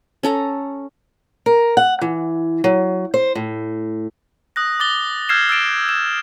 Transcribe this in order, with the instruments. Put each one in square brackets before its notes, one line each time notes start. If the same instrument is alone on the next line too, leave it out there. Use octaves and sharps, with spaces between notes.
[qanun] C#4 A4 A#5
[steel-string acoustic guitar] A#4
F#5
E3
F#3
C5
A2
[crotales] D#6 F#6 A#6
D6 A6 G7
E6 F6 G6 G#6 C7 E7
E6 A6 D7 E7
E7